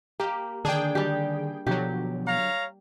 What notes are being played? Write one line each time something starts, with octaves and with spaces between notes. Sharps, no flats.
A#3 G4
D3 D#3 D4 G#4 G5
G3 G4
B2 D3 F3 F#3 B3 G4
C#5 F5 A#5